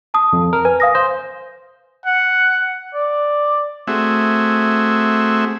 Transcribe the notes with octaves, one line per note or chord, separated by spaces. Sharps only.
A5 D#6
F2
A#4
B4 G#5
F5 D#6 A#6
C5
F#5
D5
A3 C4 F#4 G#4 E5